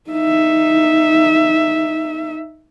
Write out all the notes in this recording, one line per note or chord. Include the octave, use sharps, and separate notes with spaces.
D#4 E5